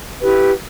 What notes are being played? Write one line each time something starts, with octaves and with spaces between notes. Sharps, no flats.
E4 G4 B4